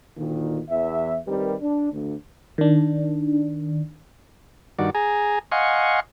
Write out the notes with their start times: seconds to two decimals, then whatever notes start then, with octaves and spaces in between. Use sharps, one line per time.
0.17 D2 A#2 D#3
0.70 E2 E5
1.27 D#3 G3 C4 G4 A#4 B4
1.61 D4
1.92 D2
2.58 D#3 D4
4.79 G2 D#3 F#4 D5
4.95 G#4 G#5 A#5
5.52 D#5 F5 F#5 G#5 C6 C#6